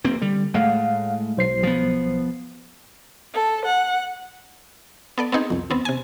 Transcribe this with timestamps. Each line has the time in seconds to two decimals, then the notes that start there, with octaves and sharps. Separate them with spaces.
0.04 F1 A#3 C4
0.22 D3 G3
0.54 A2 G#3 A3 F5 F#5
1.37 B1 C5 C7
1.63 F3 B3
3.34 A4
3.65 F#5
5.18 B3 A4 D5
5.32 B3 C4 D#4 G#4
5.50 C2 F2
5.70 D#2 B3 C4
5.85 C3 G#5